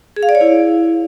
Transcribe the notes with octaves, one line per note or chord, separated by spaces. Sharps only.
G#4
F5
D5
C#5
E4